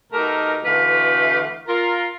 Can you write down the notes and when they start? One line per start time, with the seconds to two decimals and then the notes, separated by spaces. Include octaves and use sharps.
0.13 B2 A3 D#4 G4 A#4
0.65 B2 D3 E3 A3 B4 F5
1.67 F4 A#4